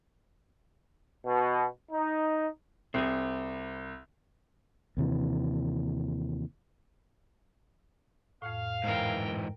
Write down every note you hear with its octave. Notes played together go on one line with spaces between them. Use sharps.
B2
D#4
C2 C4 G#4
D#2 C3 E3
F2 A2 F5
G#2 E3 A#4 G5